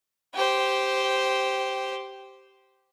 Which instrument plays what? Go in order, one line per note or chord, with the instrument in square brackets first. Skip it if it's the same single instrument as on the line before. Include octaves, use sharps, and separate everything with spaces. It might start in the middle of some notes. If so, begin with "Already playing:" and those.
[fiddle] G4 C5